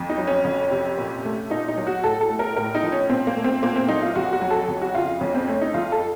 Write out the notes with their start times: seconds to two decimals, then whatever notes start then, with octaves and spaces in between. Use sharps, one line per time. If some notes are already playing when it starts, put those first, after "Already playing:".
Already playing: F2
0.09 D#4
0.18 F#3
0.27 C#4
0.45 F2
0.71 C3
0.98 A#2
1.25 A3
1.50 A#2 D#4
1.68 D#4
1.77 F#3
1.87 F#4
2.04 A2 A4
2.21 A4
2.30 A3
2.39 A#4
2.56 A2 A#4
2.75 D#4
2.83 F3
2.92 C#4
3.10 A#2 C4
3.27 A#3
3.37 A3
3.44 C4
3.62 A#2 A#3
3.76 C4
3.88 F#3 D#4
4.02 F4
4.15 F2 F#4
4.33 F#4
4.41 F#3
4.51 A4
4.68 F2
4.82 F#4
4.95 C#3 F4
5.21 F2 C#4
5.34 C4
5.48 A3 C#4
5.62 D#4
5.74 F2 F4
5.92 A4